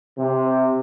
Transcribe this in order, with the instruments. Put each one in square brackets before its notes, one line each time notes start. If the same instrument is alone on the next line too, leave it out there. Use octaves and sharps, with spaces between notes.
[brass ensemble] C3